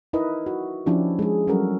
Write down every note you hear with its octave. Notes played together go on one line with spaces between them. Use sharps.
D#4 E4 A#4 B4 D#5
F#4
F3 C#4 D4 E4 G4
G#3 G#4
F#3 G3 C#4 F#4 A4 A#4